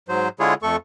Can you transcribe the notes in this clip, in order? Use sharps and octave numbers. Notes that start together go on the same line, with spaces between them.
G#2 F#3 C5
D3 G#3 E4 F4 G#4 C#5
F2 A3 A4 C#6